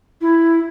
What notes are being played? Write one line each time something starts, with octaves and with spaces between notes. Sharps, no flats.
E4